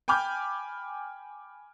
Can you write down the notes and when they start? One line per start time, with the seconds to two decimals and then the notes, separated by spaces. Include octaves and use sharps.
0.08 G5 G#5 B5 D6 F6 G6